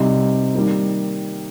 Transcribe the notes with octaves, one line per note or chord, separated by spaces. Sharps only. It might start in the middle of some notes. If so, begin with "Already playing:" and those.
Already playing: C3 G3 C4 D#4
D#3 G3 A#3